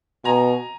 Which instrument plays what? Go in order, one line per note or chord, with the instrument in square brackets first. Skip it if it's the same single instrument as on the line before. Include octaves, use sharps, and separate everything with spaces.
[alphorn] B2 [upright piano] G#5 A#5